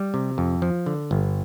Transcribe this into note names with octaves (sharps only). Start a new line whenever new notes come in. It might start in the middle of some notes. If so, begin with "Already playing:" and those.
Already playing: G3
C3
F2
F3
D3
G1